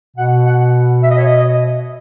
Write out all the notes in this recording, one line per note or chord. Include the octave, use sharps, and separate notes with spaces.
B2 F#5
F#5
E5
D#5
C#5
D#5